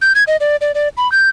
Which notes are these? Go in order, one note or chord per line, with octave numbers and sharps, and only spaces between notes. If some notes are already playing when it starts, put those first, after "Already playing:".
G6
G#6
D#5
D5
D5
D5
B5
G6